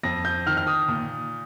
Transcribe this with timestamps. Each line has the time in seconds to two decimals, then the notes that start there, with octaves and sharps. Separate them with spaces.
0.03 F2 A#6
0.25 G6
0.46 D#3 F6
0.57 F6
0.67 D#6
0.88 A#2